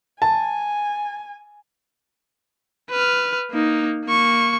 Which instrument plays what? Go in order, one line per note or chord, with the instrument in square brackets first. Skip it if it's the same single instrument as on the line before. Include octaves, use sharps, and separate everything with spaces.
[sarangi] G#5 [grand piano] A5
[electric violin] B4 F6
A#3 D#4
A#3 C#6